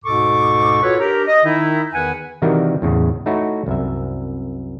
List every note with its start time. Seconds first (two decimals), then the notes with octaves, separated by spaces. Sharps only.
0.04 D2 G#2 B2 A4 C#6 D6
0.83 F4 F#4 A4 B4 C#5
1.00 D4 G4 A#4
1.27 D#5
1.45 D#3 D#4 E4
1.93 E2 D#3 B4 F#5 G#5
2.42 C3 D#3 E3 G3 F#4 A#4
2.82 E2 A2 C#3
3.26 A3 D#4 E4 F#4 C#5
3.66 C2 F#2 E5